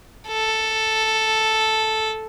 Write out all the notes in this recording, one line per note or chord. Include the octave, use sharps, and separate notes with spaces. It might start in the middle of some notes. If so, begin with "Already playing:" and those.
A4